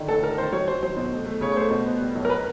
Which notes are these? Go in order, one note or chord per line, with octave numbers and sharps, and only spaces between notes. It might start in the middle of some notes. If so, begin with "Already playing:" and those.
Already playing: D3 D#3
A1 A4
D#3 A#4
D#3 C5
F#3 C#5
F#3 C5
F#3 C5
B2
A3
A3
C#3 C#5
C#5
A3 C5
B2
B3
G3
B1
A#4
B4